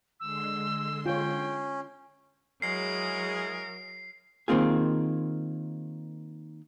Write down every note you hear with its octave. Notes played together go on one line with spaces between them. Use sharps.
D3 G#3 C6 E6
C#4 F4 C#5 G5
F#3 G#3 E4 G#4 A#4 C7
D#3 A#3 C4 F4 G#4